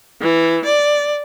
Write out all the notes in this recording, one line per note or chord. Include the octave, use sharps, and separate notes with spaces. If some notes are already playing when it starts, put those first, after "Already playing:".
E3
D5